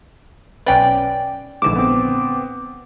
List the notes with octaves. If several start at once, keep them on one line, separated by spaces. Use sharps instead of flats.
B1 C#4 B4 D5 G5
A#1 G#2 D3 E3 D6 E7
B3 C4